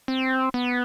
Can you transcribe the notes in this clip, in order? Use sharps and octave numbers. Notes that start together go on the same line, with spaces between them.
C4
B3